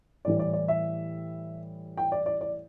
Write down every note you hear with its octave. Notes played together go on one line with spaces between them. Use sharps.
A2 E3 G3 D5
D5
D5
E5
G5
D5
D5
D5